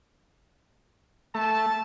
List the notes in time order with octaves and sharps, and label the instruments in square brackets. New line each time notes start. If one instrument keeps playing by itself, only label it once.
[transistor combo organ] A3 [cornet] A5